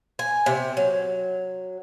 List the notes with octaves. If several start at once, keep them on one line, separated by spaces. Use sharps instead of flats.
G#5
C3
F#3